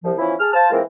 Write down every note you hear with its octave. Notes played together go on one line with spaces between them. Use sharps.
C2 F3
E3 F3 B3 C#4 E4
G#4 A5 F6
C5 F5 A5
E3 G#3 A#3 C4 F4 A#4